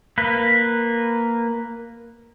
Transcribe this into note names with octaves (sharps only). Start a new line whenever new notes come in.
A#3 B4